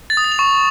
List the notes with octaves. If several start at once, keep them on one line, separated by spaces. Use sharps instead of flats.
A6
D#6
A6
F7
C#6